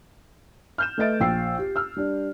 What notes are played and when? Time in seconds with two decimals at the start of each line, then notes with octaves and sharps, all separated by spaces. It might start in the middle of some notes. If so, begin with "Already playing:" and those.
0.78 F6 G6 E7
0.98 A3 B4 D#5 E5 A6 D7
1.20 A#1 G5 E6 C7
1.59 G4
1.76 E6 F6
1.96 G3 D4